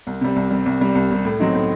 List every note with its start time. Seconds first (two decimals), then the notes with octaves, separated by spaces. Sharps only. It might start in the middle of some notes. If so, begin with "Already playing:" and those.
0.07 C2
0.21 C3 G3
0.36 C2
0.51 C3 G3
0.66 C2
0.81 C3 G3
0.95 C2
1.11 C3 G3
1.25 A2
1.40 F#3 C4 D#4
1.55 A2